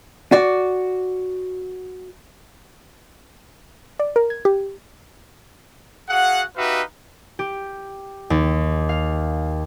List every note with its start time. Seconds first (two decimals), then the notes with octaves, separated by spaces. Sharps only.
0.32 F#4 D5
4.00 D5
4.16 A#4
4.30 G#6
4.45 G4
6.09 F#4 G#4 F5 F#5
6.57 D#4 F#4 G4 B4 E5 F5
7.39 G4
8.30 D#2
8.89 F5